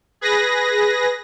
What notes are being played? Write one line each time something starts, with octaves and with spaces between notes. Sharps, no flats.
G#4 B4 A#6